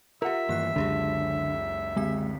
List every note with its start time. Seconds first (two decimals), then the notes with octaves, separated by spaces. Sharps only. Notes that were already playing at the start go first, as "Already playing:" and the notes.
0.22 F4 G4 A#4 E5 F#5
0.49 G2 D#3 E3 A#3 F#6 C7
0.76 C#2 F#2 D3 G#3 G4 G#4
1.97 D3 G#3 C4 B6